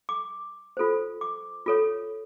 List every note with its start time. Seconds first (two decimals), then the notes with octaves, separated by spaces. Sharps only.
0.09 D6
0.77 F4 A4 C5
1.21 D6
1.66 F4 A4 C#5